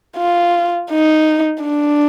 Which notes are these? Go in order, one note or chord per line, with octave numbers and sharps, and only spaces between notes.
F4
D#4
D4